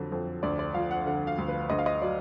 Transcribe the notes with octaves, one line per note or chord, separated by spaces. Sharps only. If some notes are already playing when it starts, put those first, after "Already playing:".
Already playing: F2 D3 F#3
F2
D2 D5
D5
F3 F5
F#5
D3 F#5
F5
D2
B4
D2 D#5
F5
D#5
F#3 D5